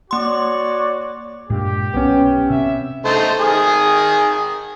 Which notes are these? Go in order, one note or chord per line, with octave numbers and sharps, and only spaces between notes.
A#3 F#4 C#5 D5 C6
G2 A#2 G#3 G4
B1 B3 C#4
C3 C4 E5
A3 D#4 C5
D#3 G#4 D#6